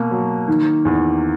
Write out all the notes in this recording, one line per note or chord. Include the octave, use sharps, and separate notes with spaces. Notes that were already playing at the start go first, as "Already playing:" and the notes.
Already playing: B2 A#3
F#3
D#3
E2